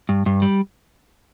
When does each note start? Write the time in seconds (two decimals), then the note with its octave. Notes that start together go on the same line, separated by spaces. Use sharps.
0.09 G2
0.26 G2
0.42 G3